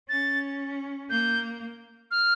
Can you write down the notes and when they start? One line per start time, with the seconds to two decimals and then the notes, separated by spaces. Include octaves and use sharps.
0.09 C#4 A6
1.10 A#3 G6
2.11 F6